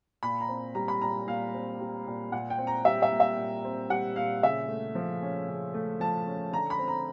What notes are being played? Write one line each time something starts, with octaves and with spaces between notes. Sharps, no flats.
A#2 B5
A#5
C4
G3 A#5
B5
A#2 A#5
A#2 F5
C4
G3
A#2
A#2 F#5
G5
C4
A#5
G3 E5
E5
A#2
E5
A#2
C4
G3 F#5
A#2 F5
C#3 E5
A3
F3
C#4
C#3
A3
F3 A5
C#4
D3 A#5
B5
C4
A#5